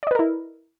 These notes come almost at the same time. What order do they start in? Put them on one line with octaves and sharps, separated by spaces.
D5 D#5 B4 A#4 E4